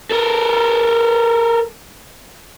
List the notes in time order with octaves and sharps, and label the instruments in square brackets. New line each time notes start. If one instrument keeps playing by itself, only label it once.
[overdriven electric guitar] A4 A#4